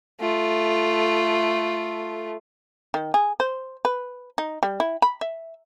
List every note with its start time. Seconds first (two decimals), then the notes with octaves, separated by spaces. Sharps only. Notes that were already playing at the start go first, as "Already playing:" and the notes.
0.20 A3 F4
2.94 D#3
3.14 G#4
3.40 C5
3.85 B4
4.38 D#4
4.63 G3
4.80 E4
5.02 B5
5.21 E5